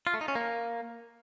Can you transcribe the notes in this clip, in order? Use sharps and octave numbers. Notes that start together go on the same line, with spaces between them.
F4
A3
D#4
C#4
A#3